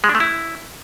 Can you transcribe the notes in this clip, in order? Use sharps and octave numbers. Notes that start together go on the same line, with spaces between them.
G#3
D4
A3
E4